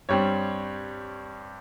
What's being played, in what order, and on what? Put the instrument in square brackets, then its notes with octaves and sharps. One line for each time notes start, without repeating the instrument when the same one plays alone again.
[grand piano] G2 G3 C4 C#5